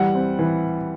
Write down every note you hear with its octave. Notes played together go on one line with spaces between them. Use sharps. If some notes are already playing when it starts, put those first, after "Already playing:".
Already playing: E3 G3 F#5
C4
E3